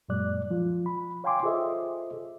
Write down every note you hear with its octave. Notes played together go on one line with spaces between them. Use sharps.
F#2 A#2 F#3 G#3 D5 F#6
F3 F4
B5
C#5 F5 G5 G#5 C6 D6
F4 G#4 A4 C5 D#5 E5